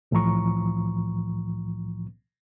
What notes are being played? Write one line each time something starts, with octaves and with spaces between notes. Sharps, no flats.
C2 A2 E3 F3 A#5 C#6